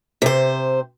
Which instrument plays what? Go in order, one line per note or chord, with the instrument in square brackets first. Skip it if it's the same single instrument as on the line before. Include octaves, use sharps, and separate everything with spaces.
[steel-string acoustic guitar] C3 C5